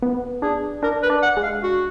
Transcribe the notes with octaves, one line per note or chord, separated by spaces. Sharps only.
B3
D4 G#4
D4 A#4
B4
D4
F#5
G#3
F5
F#4